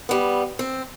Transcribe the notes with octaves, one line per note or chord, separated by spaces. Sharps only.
G3 B3
C4